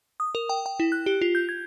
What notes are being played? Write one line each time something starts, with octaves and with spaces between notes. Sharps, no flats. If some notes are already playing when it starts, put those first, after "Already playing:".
D#6
A#4
G5
G5
E4
F#6
G4
F4
G6
G#6